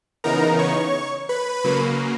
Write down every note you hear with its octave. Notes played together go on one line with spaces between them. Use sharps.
C#3 E3 B3 D#4 A#4 A#5
C#5 C#6
B4 B5
C#3 F#3 A#3